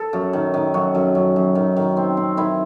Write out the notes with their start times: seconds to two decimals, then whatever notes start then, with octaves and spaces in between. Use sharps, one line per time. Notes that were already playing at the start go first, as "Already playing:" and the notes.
Already playing: A4
0.13 F#2
0.33 D#3
0.54 D#3
0.74 F#2 F#4
0.95 F#2
1.15 F#2
1.36 F#2
1.55 D#3
1.76 D#3
1.97 C4
2.17 C4
2.37 D#3 E4